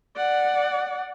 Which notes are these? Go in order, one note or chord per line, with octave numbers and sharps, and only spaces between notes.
D5 F#5